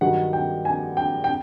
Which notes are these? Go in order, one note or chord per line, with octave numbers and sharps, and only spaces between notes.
G2 D#3 F#3 F#5
G5
G#5
G5
G5